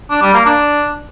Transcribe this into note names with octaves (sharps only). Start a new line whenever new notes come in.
D4
G3
A#3
D4